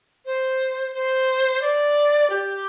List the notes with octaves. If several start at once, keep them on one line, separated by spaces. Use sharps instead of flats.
C5
C5
D5
G4